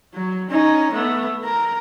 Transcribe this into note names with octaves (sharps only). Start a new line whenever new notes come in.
F#3
C#4 D#4
A3 B3
A#4